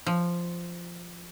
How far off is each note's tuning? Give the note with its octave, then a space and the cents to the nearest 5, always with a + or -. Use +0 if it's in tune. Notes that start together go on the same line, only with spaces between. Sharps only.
F3 -5